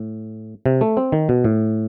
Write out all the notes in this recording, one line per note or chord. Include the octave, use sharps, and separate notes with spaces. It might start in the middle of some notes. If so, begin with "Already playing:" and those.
Already playing: A2
C3
A3
C4
D#3
B2
A2